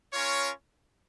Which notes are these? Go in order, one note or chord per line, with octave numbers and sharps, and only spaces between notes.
C#4 F4 A#4 C#5